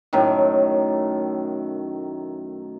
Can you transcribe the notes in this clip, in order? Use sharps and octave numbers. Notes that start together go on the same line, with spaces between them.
F#2 A2 D#3